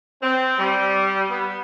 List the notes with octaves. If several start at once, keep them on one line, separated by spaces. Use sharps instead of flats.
C4
G3
B3